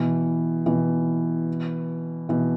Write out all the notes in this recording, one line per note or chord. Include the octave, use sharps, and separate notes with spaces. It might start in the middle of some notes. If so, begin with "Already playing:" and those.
Already playing: B2 E3
B2 E3
B2 E3